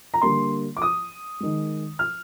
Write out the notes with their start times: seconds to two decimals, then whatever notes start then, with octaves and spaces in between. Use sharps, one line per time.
0.14 A#5
0.22 D3 G3 A#3 C6
0.77 D6
0.82 D#6
1.40 D#3 G#3
1.99 F6